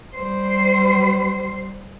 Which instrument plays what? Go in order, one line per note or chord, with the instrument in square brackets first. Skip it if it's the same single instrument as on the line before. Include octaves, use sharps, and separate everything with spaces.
[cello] G3 C5